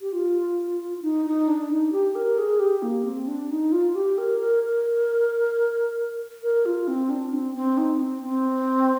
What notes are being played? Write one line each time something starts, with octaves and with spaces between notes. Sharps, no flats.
G4
F4
D#4
D#4
D4
D#4
G4
A#4
G#4
G4
A#3
C4
D4
D#4
F4
G4
A#4
A#4
A#4
A#4
F4
C4
D4
C4
C4
D#4
C4
C4